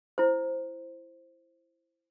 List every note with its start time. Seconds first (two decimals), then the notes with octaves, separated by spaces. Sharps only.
0.18 E4 C5